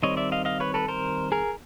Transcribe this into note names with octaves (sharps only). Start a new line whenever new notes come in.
D#3 G3 C4 C#5 D#5
D5 E5
D#5 F5
D#5 F5
B4 C#5
A4 B4
A#4 C5
G#4 A#4